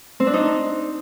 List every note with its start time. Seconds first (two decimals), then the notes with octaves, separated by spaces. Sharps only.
0.20 C4
0.27 D4
0.33 D#4